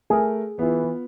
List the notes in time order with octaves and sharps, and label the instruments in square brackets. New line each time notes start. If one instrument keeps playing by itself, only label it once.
[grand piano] A3 A#4 [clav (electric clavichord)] G#4
[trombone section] E3 [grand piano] B3 F4